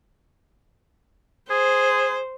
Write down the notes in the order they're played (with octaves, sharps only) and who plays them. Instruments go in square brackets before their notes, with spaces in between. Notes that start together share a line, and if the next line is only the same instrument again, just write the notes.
[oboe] G#4 [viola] C5